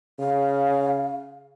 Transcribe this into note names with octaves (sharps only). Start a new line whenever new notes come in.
C#3 F5